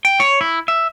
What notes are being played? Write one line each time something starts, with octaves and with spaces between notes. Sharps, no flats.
G5
C#5
E4
E5